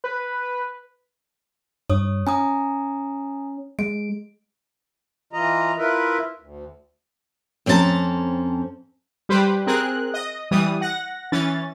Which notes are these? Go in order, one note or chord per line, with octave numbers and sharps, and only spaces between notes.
B4
G2 C#5 D#6
C#4 G#5 A#5 D#6
G#3 D7
E3 F4 D#5 A#5
E4 F4 A#4 B4 E5
D2
F2 C4 C#4 F#4 A5 A#5
G3 G4 B4 C5
C4 G#4 A#4 F#6
D#5
E3 G3 D#6
F#5 A#6
E3 C#4 A6